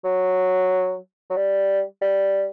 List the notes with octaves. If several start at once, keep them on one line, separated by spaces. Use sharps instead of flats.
F#3
F#3
G3
G3